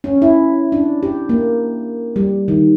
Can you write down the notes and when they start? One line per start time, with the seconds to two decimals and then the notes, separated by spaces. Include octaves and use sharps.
0.04 C#4
0.22 E4
0.72 D4
1.03 G4
1.29 A#3
2.16 G3
2.48 D#3